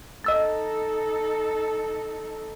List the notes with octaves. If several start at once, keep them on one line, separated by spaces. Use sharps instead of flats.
D#4 A4 D#5 E6 A6